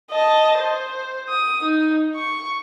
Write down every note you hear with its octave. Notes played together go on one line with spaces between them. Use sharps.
D#5 A5
C5
D#6
D#4
C#6